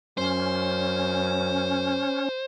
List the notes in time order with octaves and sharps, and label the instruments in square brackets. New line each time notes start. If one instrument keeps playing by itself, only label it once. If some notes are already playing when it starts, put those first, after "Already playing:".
[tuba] F#2 [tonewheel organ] C#4 [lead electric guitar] C5